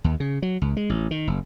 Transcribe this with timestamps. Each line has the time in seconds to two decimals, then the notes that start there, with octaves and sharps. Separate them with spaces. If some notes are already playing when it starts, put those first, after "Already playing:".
0.04 D#2
0.20 C#3
0.42 F#3
0.62 C#2
0.77 G#3
0.90 A1
1.11 D#3
1.27 F#1